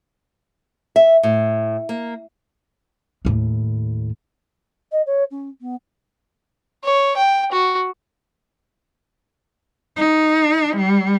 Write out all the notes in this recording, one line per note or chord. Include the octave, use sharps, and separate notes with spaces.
E5
A2
A#3
D#2 A2
D#5
C#5
C#4
B3
C#5
G5
F#4
D#4
G3